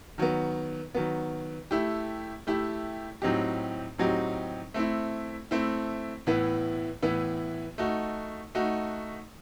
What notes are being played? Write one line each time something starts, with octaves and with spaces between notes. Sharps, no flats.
D#3 F#3 B3
D#3 F#3 B3
A3 E4 G4
A3 E4 G4
A2 F#3 C4 D#4 G4
A2 F#3 C4 D#4 G4
A3 C4 E4
A3 C4 E4
A2 E3 B3 E4
A2 E3 B3 E4
A3 D#4 F#4
A3 D#4 F#4